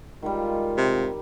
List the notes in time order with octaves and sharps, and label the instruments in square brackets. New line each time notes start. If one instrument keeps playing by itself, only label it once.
[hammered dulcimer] D#3 G3 [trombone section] G#3 F4
[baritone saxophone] C3